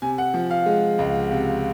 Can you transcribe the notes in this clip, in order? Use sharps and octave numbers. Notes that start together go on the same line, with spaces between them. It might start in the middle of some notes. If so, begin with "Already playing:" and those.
C3 G#5
F#5
F3
F5
G#3
C#2
C3